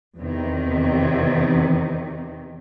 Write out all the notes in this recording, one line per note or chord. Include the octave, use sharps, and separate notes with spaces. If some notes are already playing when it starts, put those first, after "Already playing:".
E2 C3 D#3